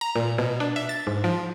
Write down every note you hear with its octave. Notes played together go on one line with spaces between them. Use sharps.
A#5
A#2
B2
D4
E5
A6
G#2
F3